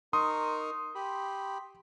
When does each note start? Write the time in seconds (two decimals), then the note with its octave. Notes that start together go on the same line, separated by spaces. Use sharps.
0.13 D#4 A#4 C6 C#6 D#6
0.95 G4 B5